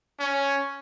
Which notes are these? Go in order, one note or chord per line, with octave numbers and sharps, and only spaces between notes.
C#4